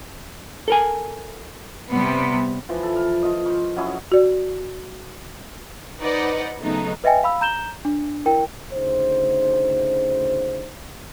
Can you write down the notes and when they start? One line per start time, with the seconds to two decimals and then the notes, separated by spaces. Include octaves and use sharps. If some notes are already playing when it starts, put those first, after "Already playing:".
0.68 A4 A#4 G#5
1.90 C3 G3 B3
2.69 E3 F3
2.83 A4
2.96 F5
3.23 F4 D#5
3.46 C5 C#6
3.77 F#3 C#4 E4 D#5
4.12 F#4 D5
6.00 D#4 B4 C5 D5 D#5 F#5
6.63 C#3 F#3 A3 B3 D#4
7.04 B4 D#5 E5 G5 G#5
7.23 F5 B5 E6
7.41 A#5 G6 E7 G7
7.85 D4
8.25 E4 A#4 G5
8.73 D2 C#3 D#4 C5